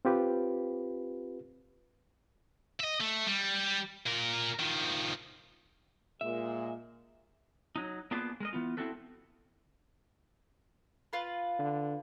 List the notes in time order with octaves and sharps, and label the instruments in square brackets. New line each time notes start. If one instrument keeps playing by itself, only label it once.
[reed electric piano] C4 F4 G4 B4
[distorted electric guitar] D#5 E5
A3
G3
A#2 A#4
D#3 F3
[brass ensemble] A#2 G#3 [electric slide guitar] E5
[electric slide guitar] F#3 D#4
A#3 B3 D4 F4 G#4 B4
G#3 A#4 D#5
E3 B3 F4
A3 C4 E4 F#4 A4 B4
[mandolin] F4 B4
[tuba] D3